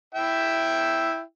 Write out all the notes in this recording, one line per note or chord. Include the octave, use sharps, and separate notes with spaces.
E4 E5 G5